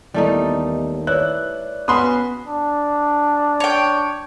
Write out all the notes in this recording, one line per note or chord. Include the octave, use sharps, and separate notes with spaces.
D#2 E3 G3 A3 B3 D#4 E4
E4 B4 C#5 D5 F#6
B3 C#4 F#4 B4 B5 C6 D#6
D4
C#5 G5